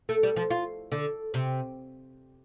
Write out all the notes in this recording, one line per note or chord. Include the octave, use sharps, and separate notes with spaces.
A3
G3
F3
F4
D3
C3